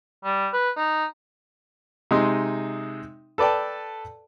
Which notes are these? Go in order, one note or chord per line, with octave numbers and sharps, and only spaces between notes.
G3
B4
D#4
C3 G#3 D#4 C6
A4 B4 D5 G5 A5